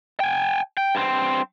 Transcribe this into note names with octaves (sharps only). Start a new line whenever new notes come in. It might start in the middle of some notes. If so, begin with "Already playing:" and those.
G5 G#5
G5
G2 C4